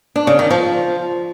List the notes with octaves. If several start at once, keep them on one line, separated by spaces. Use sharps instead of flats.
D4
C#3
D#3
F3